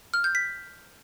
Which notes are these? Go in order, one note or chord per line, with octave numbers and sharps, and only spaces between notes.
F6
G6
B6